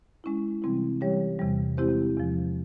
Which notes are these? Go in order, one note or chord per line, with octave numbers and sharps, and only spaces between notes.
G#3 C#4 E4
C3 E3 G3 C4 E4
E3 G3 C#4 G4 C#5
E2 C3 E3 G3
G#3 C4 E4 G4 C5
E2 C3 F3